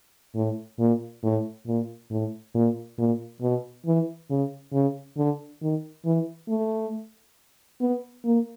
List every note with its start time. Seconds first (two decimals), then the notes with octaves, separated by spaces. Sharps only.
0.35 A2
0.79 A#2
1.23 A2
1.67 A#2
2.11 A2
2.55 A#2
2.99 A#2
3.42 B2
3.86 E3
4.30 C#3
4.73 C#3
5.18 D3
5.62 D#3
6.05 E3
6.49 A3
7.81 B3
8.25 A#3